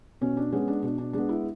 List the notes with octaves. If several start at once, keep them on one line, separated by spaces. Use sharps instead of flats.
B2 C#4
D4
G#3 B3 C#4
D4
B2 D4
D4
G#3 B3 D4
E4